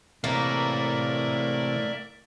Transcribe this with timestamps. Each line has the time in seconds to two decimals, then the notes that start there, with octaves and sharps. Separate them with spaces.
0.24 C3 E3 A3 A#3 E4 A#4 D5 E5